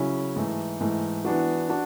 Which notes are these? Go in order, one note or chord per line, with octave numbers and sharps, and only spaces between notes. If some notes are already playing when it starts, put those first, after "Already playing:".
Already playing: C#3 F#3 C#4 E4
G#2 E3 A3
G#2 E3 A3
E3 B3 D4 F#4
D4 F#4